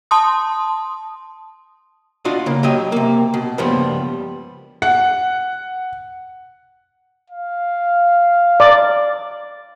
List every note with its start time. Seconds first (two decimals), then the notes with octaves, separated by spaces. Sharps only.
0.11 A5 C6 D#6
2.25 D4 F4 F#4 D#5
2.46 C#3 A#3
2.63 F#3 G4 D#5
2.92 C3 A#3
3.34 B2
3.58 C#2 G2 F3 G3 A#3 B3
4.82 F#5
7.30 F5
8.60 D5